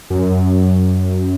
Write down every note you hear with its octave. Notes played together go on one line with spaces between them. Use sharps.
F#2